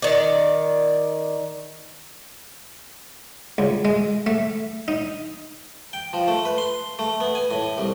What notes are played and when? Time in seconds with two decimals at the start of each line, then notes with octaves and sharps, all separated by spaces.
0.02 D#3 D5
3.58 C#2
3.85 G#3
4.27 A3
4.88 D#4
5.93 G5
6.13 F3
6.28 A3
6.45 B4
6.58 C6
6.99 A3
7.20 B3
7.35 G#5
7.51 A2
7.78 C2